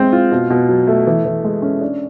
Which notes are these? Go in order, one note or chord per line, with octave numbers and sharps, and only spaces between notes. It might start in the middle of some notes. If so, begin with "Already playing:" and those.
Already playing: G#3 C4
F4
B2
B2
F#3
A3
E3
E3
G#3
C#4
D4